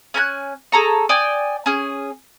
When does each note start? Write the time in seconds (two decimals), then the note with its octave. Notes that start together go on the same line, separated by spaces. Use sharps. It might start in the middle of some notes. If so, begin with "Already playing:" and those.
0.14 C#4 G#5 A#5 F#6
0.72 G#4 A4 A#5 C#6
1.09 D5 G5 G#5 D#6
1.66 C#4 G#4